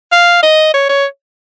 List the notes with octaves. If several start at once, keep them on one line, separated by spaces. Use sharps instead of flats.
F5
D#5
C#5
C#5